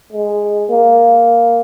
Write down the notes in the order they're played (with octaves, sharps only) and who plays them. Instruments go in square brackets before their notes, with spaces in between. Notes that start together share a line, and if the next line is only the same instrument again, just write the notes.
[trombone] G#3
A#3